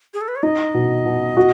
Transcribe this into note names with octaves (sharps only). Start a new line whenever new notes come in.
G#4
A4
B4
C#5
D#4 D#5
B2
B2
F#4